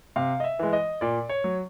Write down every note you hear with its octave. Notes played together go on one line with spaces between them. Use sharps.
C3 F5
D#5
E5
E3 G#3
D#5
A#2 D5
C#5
F#3